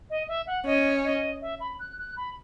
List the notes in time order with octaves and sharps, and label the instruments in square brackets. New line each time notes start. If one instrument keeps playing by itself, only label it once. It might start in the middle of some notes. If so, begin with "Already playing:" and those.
[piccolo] D#5
E5
F#5
[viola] C#4 [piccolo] D#5
[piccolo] D#5
E5
B5
F#6
F#6
B5